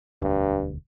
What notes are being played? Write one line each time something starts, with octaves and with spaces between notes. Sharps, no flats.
E1 D2 G2